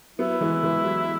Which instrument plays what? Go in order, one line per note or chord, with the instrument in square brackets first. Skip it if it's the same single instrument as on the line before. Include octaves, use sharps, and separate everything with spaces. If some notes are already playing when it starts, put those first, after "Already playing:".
[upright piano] F#3 B3 [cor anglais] E4
[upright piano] E3 G#3
E3 G#3
F#3